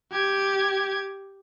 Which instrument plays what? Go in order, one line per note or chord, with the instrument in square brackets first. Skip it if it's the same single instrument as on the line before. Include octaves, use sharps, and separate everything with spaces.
[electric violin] G4 G#6